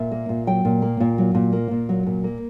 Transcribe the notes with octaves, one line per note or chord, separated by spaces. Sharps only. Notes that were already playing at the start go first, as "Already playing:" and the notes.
Already playing: A#2 E5
A#3
A#2
F#3 G5
A#2
A#3
A#2
F#3
A#2
A#3
A#2
F#3
A#2
A#3